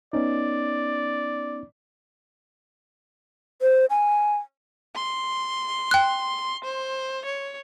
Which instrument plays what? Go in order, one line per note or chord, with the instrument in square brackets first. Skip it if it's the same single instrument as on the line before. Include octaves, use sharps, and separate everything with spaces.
[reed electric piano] B3 C#4 D#4 [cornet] D5
[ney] C5
G#5
[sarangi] C6
[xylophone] G5 F#6
[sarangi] C5
C#5